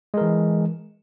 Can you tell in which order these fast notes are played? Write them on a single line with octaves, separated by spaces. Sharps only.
G#3 A#4 E3